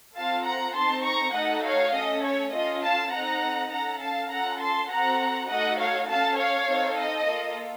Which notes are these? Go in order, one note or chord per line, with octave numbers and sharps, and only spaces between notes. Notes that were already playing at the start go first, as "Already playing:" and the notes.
C4 F4 A4 F5 A5
F#5 A#5
C4 D#4 A4 A5 C6
A#5 C#6
A3 D#4 F#4 A4 D#5 F#5
C#5 F5
A3 C#4 A4 D#5
C#5
C#4 F4 A4 D#5
F5 A5
C4 D#4 A4 F#5 A#5
C#4 A4 F#5 A#5
F5 A5
C#4 F4 A4 F#5 A#5
A5 C6
C4 F#4 A4 F#5 A#5
A3 D#4 F#4 A4 D#5 F#5
C#5 F5
C#4 A4 F5 A5
C#5 F5
C4 D#4 A4
D#5
A#3 F4 A4